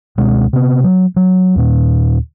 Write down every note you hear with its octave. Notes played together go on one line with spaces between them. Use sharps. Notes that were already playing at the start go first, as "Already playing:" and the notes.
C#2 B2 G#3 C#4
C3 B3
F#3
F#3
D#2 A#2